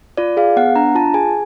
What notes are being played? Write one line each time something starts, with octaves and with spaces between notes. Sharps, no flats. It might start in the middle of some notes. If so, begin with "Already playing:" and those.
F4 D5
G#4 F5
B3 F#5
D4 A#5
F4 A5
G#4 G#5